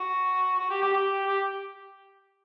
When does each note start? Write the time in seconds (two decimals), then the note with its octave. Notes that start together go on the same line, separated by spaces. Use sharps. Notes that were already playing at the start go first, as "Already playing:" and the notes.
Already playing: F#4
0.59 F#4
0.70 G4
0.82 G4
0.93 G4
1.28 G4